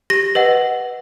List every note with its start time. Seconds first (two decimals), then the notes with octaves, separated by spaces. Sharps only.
0.10 G4 A#6
0.35 B4 D#5 F#5